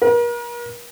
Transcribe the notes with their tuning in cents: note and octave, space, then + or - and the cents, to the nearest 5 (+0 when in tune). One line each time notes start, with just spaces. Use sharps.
A#4 +40